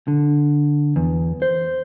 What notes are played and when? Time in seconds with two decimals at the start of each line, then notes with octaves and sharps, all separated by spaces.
0.08 D3
0.96 E2
1.42 C5